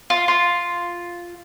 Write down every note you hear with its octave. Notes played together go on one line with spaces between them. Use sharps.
F4
F4